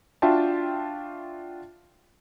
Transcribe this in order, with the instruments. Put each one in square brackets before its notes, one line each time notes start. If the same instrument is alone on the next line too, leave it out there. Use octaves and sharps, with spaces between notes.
[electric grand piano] D4 F4 F#4 E5 G5 A5